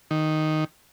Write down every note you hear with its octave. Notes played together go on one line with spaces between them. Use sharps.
D#3